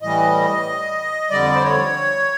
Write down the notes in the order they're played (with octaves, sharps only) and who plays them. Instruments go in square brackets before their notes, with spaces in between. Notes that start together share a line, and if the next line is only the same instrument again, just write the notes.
[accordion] A2 E3 G3 D#5
F2 D3 G3 D5
C5
C#5